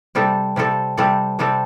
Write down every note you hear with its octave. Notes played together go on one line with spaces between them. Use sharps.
C3 G3 C4 A4
C3 G3 C4 A4
C3 G3 C4 A4
C3 G3 C4 A4